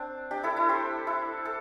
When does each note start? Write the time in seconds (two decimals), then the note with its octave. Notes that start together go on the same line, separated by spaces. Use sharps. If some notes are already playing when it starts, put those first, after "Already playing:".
Already playing: C4 D4
0.31 D4 G4
0.43 E4 A4
0.56 E4 A4
0.69 G4 C5
1.07 E4 A4
1.45 A4